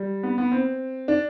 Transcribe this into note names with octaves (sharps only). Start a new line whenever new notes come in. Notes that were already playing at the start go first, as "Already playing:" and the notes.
Already playing: G3
B3
B3
C4
D4